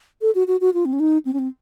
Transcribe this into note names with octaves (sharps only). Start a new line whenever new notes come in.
A4
F#4
F#4
F#4
F4
C4
C#4
D#4
C4
C#4
C4